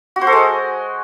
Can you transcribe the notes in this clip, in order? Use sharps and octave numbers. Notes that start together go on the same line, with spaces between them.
F#4
C5
A4
G#3